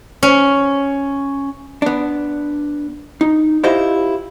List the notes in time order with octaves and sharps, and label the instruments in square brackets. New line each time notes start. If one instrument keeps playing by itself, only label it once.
[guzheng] C#4
[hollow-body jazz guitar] B3 D4
D#4
E4 F4 G4 C5 D#5 F5